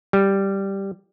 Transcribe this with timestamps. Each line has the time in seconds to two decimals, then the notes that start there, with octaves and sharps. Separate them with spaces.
0.13 G3